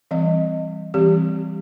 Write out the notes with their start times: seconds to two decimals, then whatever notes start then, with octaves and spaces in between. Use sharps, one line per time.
0.11 E3 G3 C4 D#5
0.94 E3 G3 C4 G4